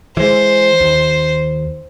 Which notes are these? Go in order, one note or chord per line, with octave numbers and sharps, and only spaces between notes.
E3 G#3 C5
D#2